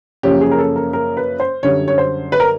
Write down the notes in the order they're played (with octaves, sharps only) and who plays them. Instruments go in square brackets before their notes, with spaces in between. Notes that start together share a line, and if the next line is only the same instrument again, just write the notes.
[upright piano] F#2 C#3 F3 A#3 C#4 G4
G#4
A#4
A4
A#4
A#4
B4
C5
F#2 D3 G3 C#5
C#5
C5
B4
A#4